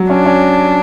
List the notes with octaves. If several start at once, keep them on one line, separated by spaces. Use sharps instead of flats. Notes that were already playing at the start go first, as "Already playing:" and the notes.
Already playing: F#3
C#4 D4
C#4